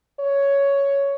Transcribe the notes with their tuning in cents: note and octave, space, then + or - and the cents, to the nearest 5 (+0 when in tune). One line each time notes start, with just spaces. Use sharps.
C#5 +5